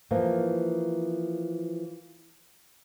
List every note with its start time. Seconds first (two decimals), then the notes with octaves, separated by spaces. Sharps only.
0.11 E3 F3 A#3